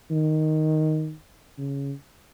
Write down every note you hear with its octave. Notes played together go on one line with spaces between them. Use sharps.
D#3
C#3